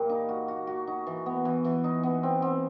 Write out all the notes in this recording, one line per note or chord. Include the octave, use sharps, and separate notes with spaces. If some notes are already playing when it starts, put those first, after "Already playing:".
Already playing: A#2 G3 A#3
D#4
F#4
F#4
F#4
D#4
E3
B3
E3
E3
D#4
B3
C4
C4